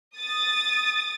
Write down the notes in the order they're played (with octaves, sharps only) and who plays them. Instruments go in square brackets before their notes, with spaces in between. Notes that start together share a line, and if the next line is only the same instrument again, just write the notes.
[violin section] D#6 A6